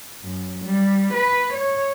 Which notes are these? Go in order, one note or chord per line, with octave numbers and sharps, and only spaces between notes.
F#2
G3
B4
C#5